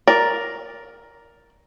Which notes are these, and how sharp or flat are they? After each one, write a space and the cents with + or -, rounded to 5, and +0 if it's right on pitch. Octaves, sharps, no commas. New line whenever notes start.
A#4 +5 D5 +0